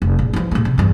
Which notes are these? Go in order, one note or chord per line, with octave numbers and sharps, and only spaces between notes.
F1
A#1
E3 F3
A#1 A3
C3
E2 G2